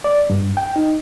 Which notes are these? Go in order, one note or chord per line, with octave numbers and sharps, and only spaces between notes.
D5
G2
G5
D#4